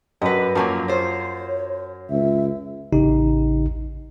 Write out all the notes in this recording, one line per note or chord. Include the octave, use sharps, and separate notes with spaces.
F#2 B4 D#5
F#2 F3 F#3 A#3
F4 C5 C#5
C#2 E5
A1 C#3 D#4 G4